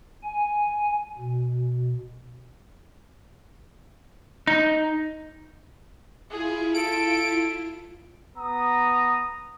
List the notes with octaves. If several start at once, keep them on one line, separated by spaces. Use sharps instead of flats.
G#5
B2
D#4
E4 F4 G#4
A4 D7
B3 A#5 D#6